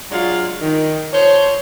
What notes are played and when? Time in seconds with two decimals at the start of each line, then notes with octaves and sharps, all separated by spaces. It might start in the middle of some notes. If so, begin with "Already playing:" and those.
0.11 F#3 G#3 D4 F4
0.61 D#3
1.13 F3 C5 C#5